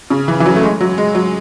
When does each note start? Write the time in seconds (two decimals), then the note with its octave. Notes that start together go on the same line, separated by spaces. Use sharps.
0.10 C#3
0.28 E3
0.40 E3
0.46 F#3
0.56 A3
0.63 G#3
0.81 F#3
0.98 G#3
1.15 F#3